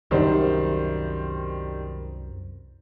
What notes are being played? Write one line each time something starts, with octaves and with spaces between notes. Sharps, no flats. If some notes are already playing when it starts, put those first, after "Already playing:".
C2 F#2 D#3 G3 C5